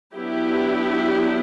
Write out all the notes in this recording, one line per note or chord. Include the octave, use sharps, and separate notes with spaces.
F#3 B3 D4 E4 G4